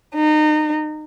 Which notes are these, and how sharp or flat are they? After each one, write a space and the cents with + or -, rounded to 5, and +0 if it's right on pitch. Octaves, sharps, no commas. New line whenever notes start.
D#4 -25